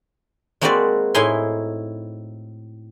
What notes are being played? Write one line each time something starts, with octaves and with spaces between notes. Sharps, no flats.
G#3 A#3 C4 F#4 B4 D5
A2 D#4 E4 G#5 C6